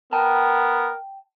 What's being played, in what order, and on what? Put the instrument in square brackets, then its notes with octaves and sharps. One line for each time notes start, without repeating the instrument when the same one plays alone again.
[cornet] B3 [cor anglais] A#4 [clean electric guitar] G5 A5